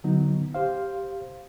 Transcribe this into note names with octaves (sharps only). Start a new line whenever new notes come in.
D3 F#3 B3 D#4
G4 C5 F5